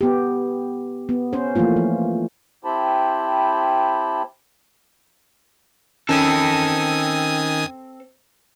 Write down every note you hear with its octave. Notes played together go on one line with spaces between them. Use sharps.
B3 G4
B3
C#4 C5
E3 F3 A3 A#3 F4
F3
C4 E4 G4 C5 A5 B5
D#3 C4 C#4 A4 G#5 D#6